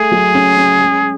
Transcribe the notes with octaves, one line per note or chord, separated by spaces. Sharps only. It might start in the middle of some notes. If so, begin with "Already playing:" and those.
Already playing: A3 G#4
F#3
C#4
C#4
G#3